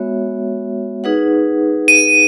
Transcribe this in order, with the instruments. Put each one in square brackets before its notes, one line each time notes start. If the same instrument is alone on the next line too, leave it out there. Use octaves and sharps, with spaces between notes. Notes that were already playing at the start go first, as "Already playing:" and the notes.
Already playing: [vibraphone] G#3 B3 F#4 C#5 E5
D#4 G#4 B4 F#5
[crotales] D#7